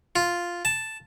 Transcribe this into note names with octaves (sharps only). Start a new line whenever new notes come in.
F4
A5